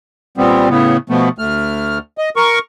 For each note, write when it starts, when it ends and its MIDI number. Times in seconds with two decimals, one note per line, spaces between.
0.38 0.69 46
0.38 0.69 55
0.38 0.69 59
0.38 0.69 60
0.69 0.97 45
0.69 0.97 49
0.69 0.97 59
1.10 1.29 47
1.10 1.29 53
1.10 1.29 57
1.10 1.29 59
1.39 1.98 38
1.39 1.98 57
1.39 1.98 89
2.18 2.29 75
2.36 2.59 70
2.36 2.59 85